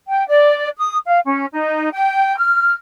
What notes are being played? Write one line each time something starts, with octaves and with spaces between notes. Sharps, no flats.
G5
D5
D#6
F5
C#4
D#4
G5
F6